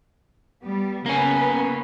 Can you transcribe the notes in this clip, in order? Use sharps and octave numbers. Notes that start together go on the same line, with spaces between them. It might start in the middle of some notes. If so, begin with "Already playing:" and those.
G3 B3
C#3 A#3 B3 C#4 B4